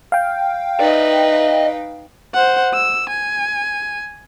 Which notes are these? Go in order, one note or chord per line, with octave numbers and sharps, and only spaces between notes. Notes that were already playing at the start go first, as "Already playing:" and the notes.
F5 G5
D#4 B4 D5 D#5
C5 F#5
E6
G#5